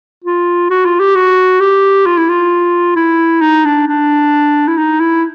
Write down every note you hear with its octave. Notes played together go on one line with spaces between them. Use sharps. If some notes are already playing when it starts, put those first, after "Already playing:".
F4
F#4
F4
G4
F#4
G4
F4
E4
F4
E4
D#4
D4
D4
E4
D#4
E4